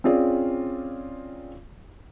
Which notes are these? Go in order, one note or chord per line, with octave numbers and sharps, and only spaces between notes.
C4 C#4 F4 G#4 D5